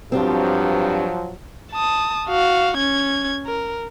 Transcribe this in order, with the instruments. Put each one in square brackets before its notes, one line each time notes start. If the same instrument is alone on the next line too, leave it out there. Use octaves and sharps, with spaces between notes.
[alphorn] G2 [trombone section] F3 F#3 [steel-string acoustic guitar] C4 D4 G4
[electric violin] A5 D#6
F#4 F5
C#4 G#6
A#4